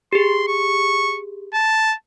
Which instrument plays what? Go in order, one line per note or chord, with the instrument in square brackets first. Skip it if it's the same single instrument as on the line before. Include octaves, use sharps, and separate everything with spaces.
[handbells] G4 G#4 [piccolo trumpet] C6
[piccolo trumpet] C#6
A5